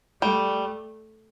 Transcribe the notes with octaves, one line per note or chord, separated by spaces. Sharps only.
G3 A3